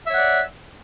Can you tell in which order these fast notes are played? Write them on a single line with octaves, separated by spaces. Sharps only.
E5 C#5 F#5 D5